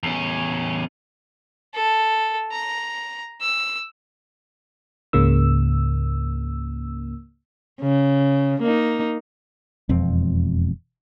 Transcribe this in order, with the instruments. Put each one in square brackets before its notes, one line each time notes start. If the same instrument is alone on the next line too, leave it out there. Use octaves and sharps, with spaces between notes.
[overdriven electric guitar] E2 C#4
[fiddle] A4
A#5
E6
[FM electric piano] C#2 G#2 C#3 A#3 E6
[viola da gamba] C#3
A#3 D#4
[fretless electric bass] E1 F2 C4